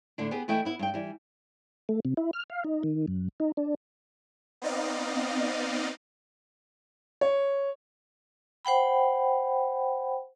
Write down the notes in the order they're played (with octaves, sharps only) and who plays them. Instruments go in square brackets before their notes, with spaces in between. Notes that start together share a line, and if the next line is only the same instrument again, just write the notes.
[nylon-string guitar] A2 D3 D4
B3 G4 G#4 B4
E3 A3 E4 D#5 G5
B3 E4
G2 G5
E3 G3
[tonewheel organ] A3
C3
E4
F6
F5
D#4
D#3
F#2
D#4
D4
[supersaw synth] B3 C4 D#4 D5 D#5 F5
[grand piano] C#5
[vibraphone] C5 F#5 G5 B5